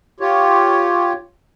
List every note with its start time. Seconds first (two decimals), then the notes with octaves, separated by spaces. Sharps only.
0.20 F4 G4 C#5